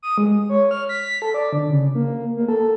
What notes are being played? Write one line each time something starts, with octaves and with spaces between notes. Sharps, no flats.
D#6
G#3
C#5
F6
B6
A4
D5
D3
C#3
A#3
A#3
A4